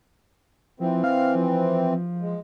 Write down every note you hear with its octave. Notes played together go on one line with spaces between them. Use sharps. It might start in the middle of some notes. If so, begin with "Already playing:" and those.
E3 F3 C4
F5
F3
G#3